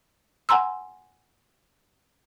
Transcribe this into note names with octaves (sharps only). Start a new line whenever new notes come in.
F#5 G#5 A#5 C6 E6